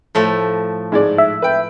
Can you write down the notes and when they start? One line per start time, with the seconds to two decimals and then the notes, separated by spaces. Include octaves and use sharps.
0.15 A2 F3 A3
0.92 G#2 G#3 D5
1.18 E5
1.42 B4 G5